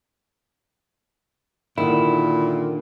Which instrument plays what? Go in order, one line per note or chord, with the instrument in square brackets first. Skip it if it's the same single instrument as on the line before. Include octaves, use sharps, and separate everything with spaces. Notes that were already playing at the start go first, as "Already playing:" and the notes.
[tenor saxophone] A#2 [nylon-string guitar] D3 D#3 [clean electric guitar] E4